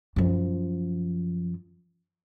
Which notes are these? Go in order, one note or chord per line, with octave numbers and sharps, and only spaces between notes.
F#2 F3